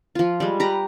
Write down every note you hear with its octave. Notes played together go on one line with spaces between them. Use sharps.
F3 F4
G3 G#3
G4 B4 A#5